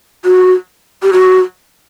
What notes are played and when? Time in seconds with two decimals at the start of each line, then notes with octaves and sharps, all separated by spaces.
0.25 F#4
1.03 G4
1.13 F#4